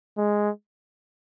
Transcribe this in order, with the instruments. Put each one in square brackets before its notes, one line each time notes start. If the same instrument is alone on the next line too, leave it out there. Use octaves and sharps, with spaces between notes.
[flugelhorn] G#3